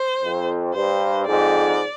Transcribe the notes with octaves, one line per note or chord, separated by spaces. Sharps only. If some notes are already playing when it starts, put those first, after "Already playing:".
Already playing: C5
F2
G2 C5
F2 G#2 D5